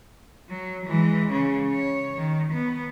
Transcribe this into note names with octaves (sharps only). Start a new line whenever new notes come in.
F#3
E3 G#3
C#3 C#4
C#5
D#3
B3